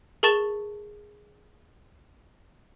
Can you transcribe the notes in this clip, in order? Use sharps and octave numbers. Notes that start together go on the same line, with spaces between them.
G#4 A#4 A5 C#6 A6 E7